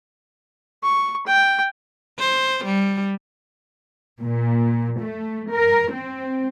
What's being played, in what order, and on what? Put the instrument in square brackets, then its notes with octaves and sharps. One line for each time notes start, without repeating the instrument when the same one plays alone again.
[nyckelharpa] C#6
G5
[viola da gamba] C5
G3
[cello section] A#2
A3
A#4
C4